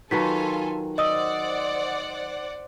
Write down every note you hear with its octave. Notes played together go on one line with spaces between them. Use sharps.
D#3 F#3 F4 A4 B4 G#5 B6
C5 D5 D#5 F#5 D#6 E6